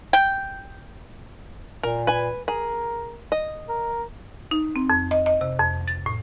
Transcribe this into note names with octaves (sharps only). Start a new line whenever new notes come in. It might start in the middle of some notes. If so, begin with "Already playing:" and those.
G5
A#2 A#4
B4 G#5
G#4 A#4
D#5
A#4
D#4
C4
F2
D#5
D#5
C3
F2
A6
A2